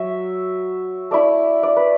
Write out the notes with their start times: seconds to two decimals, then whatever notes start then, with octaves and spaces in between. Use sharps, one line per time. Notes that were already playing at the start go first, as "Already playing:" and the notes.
Already playing: F#3 E5
1.11 A3 E4 D5
1.63 D5
1.76 B4